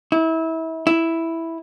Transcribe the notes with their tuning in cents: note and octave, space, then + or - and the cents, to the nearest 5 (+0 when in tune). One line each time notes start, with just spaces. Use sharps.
E4 -30
E4 +0